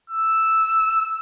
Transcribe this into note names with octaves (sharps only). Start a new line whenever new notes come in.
E6